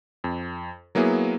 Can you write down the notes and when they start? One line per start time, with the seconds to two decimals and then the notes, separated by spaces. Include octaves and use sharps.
0.24 F2
0.95 F#3 A#3 B3 E4 G#4